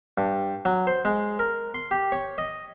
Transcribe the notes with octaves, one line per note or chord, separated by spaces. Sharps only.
G2
F#3
C5
G#3
A#4
C6
G4
C#5
D#5